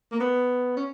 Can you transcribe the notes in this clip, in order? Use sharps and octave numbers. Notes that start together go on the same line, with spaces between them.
A#3
B3
C#4